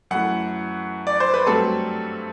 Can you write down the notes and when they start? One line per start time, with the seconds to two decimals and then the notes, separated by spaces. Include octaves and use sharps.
0.11 F#2 E3 A3 F#5
1.07 D5
1.20 C5
1.34 B4
1.46 G2 F#3 A3 C4 A4